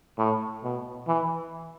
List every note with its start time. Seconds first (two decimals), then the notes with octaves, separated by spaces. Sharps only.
0.18 A2
0.63 B2
1.08 E3